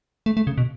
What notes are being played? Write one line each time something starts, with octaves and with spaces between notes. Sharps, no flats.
A3
A3
C#3
B2